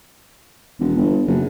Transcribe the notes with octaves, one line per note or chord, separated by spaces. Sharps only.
E1
G1
F#1